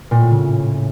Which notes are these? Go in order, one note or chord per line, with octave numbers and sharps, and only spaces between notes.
A#2
A2
C#3